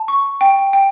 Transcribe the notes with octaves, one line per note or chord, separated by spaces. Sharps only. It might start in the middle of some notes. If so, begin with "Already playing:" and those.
Already playing: A5
C#6
G5
G5